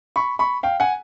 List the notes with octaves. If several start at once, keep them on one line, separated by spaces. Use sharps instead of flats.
B5 C#6
B5 C#6
F5 G5
F#5 G#5